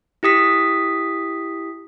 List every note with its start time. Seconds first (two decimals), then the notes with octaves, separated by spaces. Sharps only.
0.23 E4 G4 D#6 B6